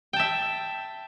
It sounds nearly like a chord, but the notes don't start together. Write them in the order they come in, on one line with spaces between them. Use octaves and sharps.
G5 A5 E5